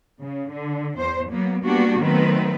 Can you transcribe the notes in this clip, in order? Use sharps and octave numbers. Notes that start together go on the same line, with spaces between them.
C#3
D3
E2 C5
F#3 A#3 B3
G3 A#3 B3 D4 F#4 G4
D#3 F#3 A3 B3 C4 B4